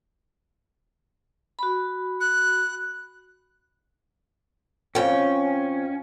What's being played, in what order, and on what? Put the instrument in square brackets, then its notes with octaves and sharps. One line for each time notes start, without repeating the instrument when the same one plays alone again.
[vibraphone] F#4 B5
[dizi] F#6
[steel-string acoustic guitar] F2 G5 [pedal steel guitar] C#4